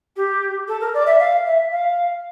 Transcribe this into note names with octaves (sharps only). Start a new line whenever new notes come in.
G4
A4
A#4
D5
E5
F5
E5
F5